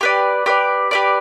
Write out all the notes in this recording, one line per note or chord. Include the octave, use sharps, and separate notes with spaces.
G4 B4 D5
G4 B4 D5
G4 B4 D5